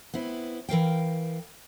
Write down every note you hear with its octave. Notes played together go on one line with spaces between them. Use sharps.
B3 C4 E4
E3 A#4 F5 G5